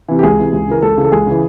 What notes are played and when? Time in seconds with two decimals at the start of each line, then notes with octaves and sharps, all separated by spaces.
0.08 C3 E3
0.19 G4
0.23 C#2 G#4
0.38 C3 E3
0.53 C#2
0.68 C#3 E3 A#4
0.82 C#2 A4
0.97 C#3 E3
1.04 A4
1.12 C#2 G#4
1.27 C#3 E3